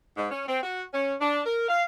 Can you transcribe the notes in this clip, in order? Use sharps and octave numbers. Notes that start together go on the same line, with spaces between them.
G#2
C#4
C4
F#4
C#4
D4
A#4
F5